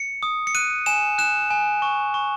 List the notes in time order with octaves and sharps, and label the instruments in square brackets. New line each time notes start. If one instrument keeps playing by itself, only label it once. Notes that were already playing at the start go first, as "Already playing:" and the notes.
Already playing: [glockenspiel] C#7
D#6
C#7
F#6 D#7
G#5 E7
F#6 E7
G#5
C#6
C#6